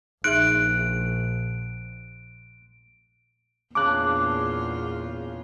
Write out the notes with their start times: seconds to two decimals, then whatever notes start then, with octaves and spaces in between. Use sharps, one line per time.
0.24 A#1 D#4 G#4 E5 F#6 D7
3.75 E2 A#2 C#3 D4 F4 D6 F#6